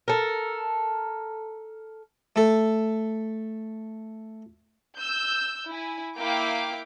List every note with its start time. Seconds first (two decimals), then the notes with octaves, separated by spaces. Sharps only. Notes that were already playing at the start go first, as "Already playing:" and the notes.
0.08 A4 A#4
2.36 A3 A4
4.99 E6 G6
5.69 E4 G#5
6.17 A#3 E4 F5 G5 D6 D7